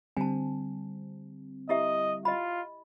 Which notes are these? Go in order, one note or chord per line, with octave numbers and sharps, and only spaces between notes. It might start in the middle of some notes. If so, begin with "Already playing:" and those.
D3 G3 C4 G#5 A5
E4 G4 D#5 E5
F4 D#5 B5